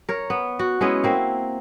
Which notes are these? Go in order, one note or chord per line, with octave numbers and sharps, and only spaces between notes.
A#4 C#5
B3
F#4
G#3 B3 C#4 E4
A#3 C4 E5